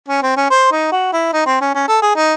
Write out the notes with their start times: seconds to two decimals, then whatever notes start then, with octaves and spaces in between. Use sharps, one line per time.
0.08 C#4
0.22 C4
0.37 C#4
0.50 C5
0.71 D#4
0.92 F#4
1.13 E4
1.33 D#4
1.46 C4
1.61 C#4
1.75 C#4
1.88 A4
2.02 G#4
2.16 D#4